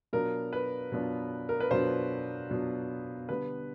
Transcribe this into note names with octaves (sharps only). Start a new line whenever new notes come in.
B2 F#3 B3 D4 F4 A#4
B4
B2 F#3 B3 D4 F4
A#4
B4
B2 F#3 B3 D4 F4 C5
B2 F#3 B3 D4 F4
D3 G3 B3 B4